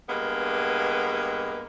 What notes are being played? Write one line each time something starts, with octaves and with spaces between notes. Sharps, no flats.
G2 G#3 A#3 B3